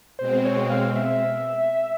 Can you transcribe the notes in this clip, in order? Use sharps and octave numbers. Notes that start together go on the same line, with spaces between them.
B2 G#3 C4 C5
C#5
F5
E5